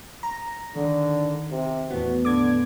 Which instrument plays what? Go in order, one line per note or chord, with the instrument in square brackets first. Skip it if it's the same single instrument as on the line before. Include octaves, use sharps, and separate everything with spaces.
[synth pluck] A#5
[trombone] D3 [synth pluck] D#3
[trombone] C3
[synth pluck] E2 A2 B3 [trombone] F#4
[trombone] D3 [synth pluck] D6 G#6